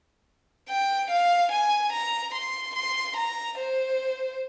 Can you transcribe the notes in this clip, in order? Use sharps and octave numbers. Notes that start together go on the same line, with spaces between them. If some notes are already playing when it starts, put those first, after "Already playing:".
G5
F5
G#5
A#5
C6
C6
A#5
C5